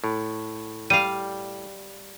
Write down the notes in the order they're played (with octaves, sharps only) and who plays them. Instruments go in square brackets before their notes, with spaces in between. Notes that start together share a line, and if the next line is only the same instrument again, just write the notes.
[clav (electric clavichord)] A2
[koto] G3 F5 [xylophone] D#7